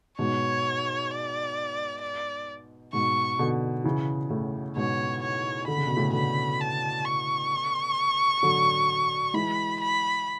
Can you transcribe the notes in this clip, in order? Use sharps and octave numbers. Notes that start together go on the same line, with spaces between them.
G#2 B2 C#5
D5
D5
G#2 B2 C#6
B2 D3
C#3 E3
A2 C#3
G#2 B2 C#5
C#5
D3 B5
C#3
B2
A2 C#3
B2 D3 B5
A5
C#6
D3 F#3
E3 G#3 B5
B5